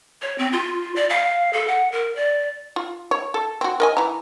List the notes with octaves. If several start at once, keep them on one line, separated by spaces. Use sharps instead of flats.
C#5
C4
F4
D5
F5
A4
F#5
A#4
D5
F4
C#5
A4
C4 F#4
A#4 D#5 G#5
E3 A#5